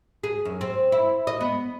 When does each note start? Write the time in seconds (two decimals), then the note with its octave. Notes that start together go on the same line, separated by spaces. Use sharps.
0.24 G#4
0.45 F#2
0.61 C4
0.92 E4
1.27 D#5
1.41 B3